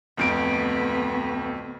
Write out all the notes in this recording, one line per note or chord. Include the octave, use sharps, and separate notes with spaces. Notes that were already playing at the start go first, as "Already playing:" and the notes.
D1 F2 A3 B3 D7